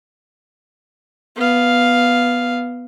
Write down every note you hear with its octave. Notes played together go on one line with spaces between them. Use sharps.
B3 F5